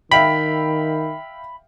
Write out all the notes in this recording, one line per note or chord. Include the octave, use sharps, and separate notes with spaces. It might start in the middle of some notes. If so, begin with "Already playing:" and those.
D#3 E5 F5 G5 B5